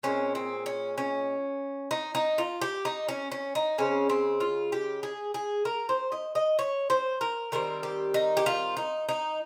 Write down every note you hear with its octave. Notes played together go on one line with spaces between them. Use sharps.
A#2 G#3 C4 C#4
C4
C#4
C#4
D#4
D#4
F4
G4
D#4
C#4
C#4
D#4
C#3 G#3 C4 C#4
C4
F4
G4
G#4
G#4
A#4
C5
D#5
D#5
C#5
C5
A#4
D#3 G3 C4 A#4
G4
D#4
G4
F4
D#4
D#4